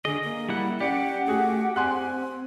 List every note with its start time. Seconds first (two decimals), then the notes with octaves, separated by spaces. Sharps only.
0.05 D3 G#4 D#5
0.24 A#3
0.49 G3 E4 F#5
0.80 C#4 G4 D5 F#5 C#7
1.28 A3 F#4 G#4
1.76 C4 G#5 C6 F#6